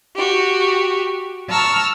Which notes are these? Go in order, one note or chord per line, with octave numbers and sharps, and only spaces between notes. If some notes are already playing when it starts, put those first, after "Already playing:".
F#4 G4
A5 A#5 C#6 E6 F6